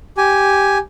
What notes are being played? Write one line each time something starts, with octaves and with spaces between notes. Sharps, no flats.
G4 G#5